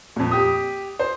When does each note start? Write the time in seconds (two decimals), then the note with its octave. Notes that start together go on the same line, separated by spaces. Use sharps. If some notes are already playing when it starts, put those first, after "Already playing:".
0.16 F2 A#2
0.31 G4 D#6
0.99 C5